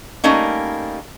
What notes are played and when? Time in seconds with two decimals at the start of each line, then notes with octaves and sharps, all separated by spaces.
0.24 G3 A3 A#3 C#4 D#4